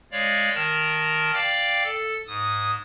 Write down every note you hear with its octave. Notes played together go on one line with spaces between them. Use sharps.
G#3 C#5 D5 F5
D#3 A#4 A5
D5 F5 G5 D6
A4
G#2 D#6